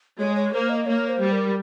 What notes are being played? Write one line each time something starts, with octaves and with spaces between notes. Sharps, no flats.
G#3 C#5
C#5
A#3 C5
D#5
A#3 C#5
C5
G3
A#4